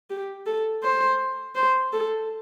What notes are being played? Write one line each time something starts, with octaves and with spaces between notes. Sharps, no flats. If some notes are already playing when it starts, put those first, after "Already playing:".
G4
A4
C5
C5
A4